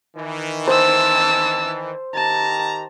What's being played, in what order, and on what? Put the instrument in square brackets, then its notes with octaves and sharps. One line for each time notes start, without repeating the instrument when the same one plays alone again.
[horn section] D#3 E3
[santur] C5 [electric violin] A5 E6
[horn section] D#3 G4 A#5 [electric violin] A5